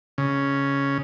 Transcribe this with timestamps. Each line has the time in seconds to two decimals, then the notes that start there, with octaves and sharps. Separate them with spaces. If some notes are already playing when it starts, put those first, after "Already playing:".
0.18 C#3